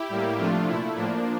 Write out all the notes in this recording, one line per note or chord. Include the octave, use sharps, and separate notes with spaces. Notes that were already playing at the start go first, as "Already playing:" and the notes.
Already playing: E4 G4
A2 G3 A#3
C3 F3 A3 D4 F4
A#2 A3 E4
A2 F3 A#3 D4